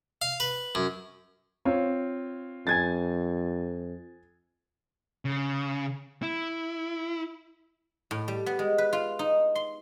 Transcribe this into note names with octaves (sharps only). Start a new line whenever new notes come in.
F5
B4
F#2
C4 F4 C#5
F2 G#5 G#6 A6
C#3
E4
A2
G3
B3
G#3
B4
F4
D#4
C6